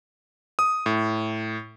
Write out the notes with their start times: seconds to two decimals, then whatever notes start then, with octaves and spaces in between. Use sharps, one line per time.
0.59 D#6
0.86 A2